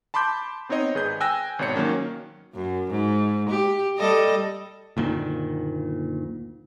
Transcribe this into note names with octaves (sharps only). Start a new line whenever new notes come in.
A5 B5 C6 D6 G6
B3 C4 D#4 C#5 D#5
G#1 G#4 B4 G6
G5 G#5 E6 F#6 A#6
G#1 B2 C#5 C#7
D#3 F#3 A#3 C#4
F#2
G#2
G4
G3 A4 D#5
F#1 D2 A#2 D#3